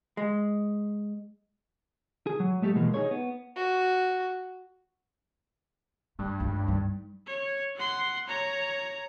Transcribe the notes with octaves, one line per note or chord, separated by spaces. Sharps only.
G#3
G#4
F#3
G#3 A3 G4 A4
B2 E3 G#3 A#3
D#4 E4 G#4 C#5
B3
F#4
G2 A3
G1 C#2
G3 D#4
C#5
F#5 C6
C#5 A#5